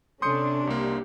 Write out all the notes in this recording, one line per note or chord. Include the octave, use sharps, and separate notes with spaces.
C3 C#4 D4 A4 C6 D#6 G6 C#7
C2 A#3 G4